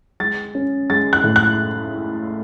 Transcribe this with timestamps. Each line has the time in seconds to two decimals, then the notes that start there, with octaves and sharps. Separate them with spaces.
0.20 G#3 A6
0.55 C#4
0.90 G#3 A6
1.13 F#6
1.24 A2
1.36 F#6